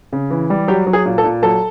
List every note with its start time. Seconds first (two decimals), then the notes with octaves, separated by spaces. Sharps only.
0.13 C#3
0.31 E3
0.50 G3
0.68 F#3 G4
0.87 F#3
0.93 G#4
1.06 A#2
1.18 A4
1.24 A#2
1.42 F#3 A4